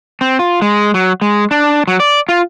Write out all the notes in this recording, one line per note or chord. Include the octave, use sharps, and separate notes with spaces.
C4
F4
G#3
F#3
G#3
D4
F#3
D5
F4